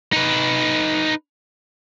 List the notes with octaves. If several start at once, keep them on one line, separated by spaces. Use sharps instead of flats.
D#4 B4